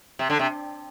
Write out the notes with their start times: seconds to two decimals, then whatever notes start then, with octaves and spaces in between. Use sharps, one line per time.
0.19 C3
0.30 D3
0.39 C3